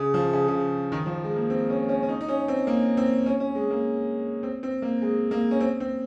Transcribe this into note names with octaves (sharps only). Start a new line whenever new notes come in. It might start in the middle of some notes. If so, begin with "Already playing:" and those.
Already playing: C#3
F3
C#3
C#3
D#3
F3
G#3
A#3
C4
C#4
C#4
C#4
D#4
D#4
C#4
C4
A#3
C4
C#4
C#4
G#3
A#3
C4
C4
A#3
G#3
A#3
C#4
C4
C4